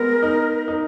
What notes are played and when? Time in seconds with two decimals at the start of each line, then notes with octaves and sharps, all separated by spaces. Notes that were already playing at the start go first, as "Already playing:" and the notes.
Already playing: G#3 B3 A#4
0.23 D#4
0.68 D#4